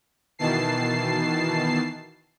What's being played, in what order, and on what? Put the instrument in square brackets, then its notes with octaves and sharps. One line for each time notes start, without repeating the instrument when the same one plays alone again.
[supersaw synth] B2 D#3 E3 A5 C7